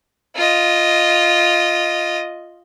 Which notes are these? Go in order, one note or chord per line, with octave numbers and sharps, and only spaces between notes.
F4 D#5